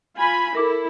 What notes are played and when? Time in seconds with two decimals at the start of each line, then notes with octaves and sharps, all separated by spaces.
0.17 F4 G#5 B5
0.55 E4 A4 A#4 D6